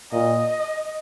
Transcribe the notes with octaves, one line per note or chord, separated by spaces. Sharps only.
A#2 D#5